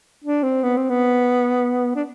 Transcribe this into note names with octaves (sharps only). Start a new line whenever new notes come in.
D4
C4
B3
C4
B3
D4